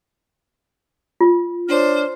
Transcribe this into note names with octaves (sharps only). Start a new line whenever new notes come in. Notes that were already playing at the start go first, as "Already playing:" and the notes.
F4
D4 C5 C#5 F6